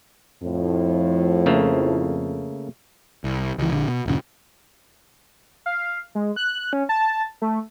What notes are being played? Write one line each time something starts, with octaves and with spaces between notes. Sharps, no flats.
F2 A2 F3
C#3 A3 A#3
C2
C#2 E3
A#1 D3
B2
D#1 F#2 C#3
F5
G#3
F#6
C#4
A5
A3